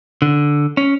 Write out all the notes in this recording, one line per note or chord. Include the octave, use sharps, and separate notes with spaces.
D3
C#4